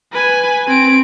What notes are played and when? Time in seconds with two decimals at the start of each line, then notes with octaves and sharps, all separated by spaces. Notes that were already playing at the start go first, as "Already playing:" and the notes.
0.13 B4 G#5
0.68 C4 D7